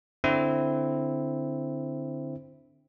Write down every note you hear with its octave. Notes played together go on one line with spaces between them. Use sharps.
D3 C4 E4